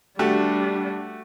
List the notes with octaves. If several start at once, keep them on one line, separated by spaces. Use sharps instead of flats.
G3 A3 D4 F#4 G4